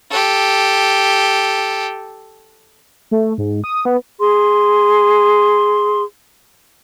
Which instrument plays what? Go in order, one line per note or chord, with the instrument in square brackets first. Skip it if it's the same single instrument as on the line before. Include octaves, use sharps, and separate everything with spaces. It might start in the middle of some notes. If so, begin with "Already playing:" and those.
[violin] G4 A4
[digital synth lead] A3
G#2
D#6
B3
[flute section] G#4 C6